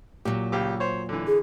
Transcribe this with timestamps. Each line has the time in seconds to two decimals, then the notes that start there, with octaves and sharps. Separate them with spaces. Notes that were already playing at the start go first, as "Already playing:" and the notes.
0.25 A#2 F#3 G4
0.52 C#2 G4 D6
0.80 C5 C#5
1.09 D3 E3
1.27 G#4